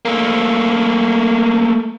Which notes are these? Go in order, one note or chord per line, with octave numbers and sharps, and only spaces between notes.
A3 A#3